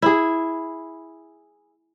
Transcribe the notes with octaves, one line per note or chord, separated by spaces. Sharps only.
E4 G#4